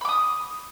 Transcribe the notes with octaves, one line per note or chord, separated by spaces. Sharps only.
B5 D6 D#6